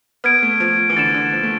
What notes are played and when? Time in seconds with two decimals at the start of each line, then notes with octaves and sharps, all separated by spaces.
0.24 B3 F6 G#6 D7
0.42 A3
0.60 F3
0.90 E3
0.97 D3 A6 E7
1.14 D3
1.33 F3
1.43 A3